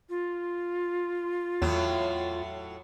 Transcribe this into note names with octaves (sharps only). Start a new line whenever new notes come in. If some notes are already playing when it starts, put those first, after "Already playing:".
F4
E2 A2 F#3